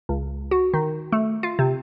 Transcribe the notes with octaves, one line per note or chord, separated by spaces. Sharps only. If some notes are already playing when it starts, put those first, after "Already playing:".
C#2
F#4
D#3
A3
F4
C3